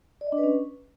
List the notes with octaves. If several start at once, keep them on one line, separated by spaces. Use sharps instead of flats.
D5
D#5
D4
B4
C#4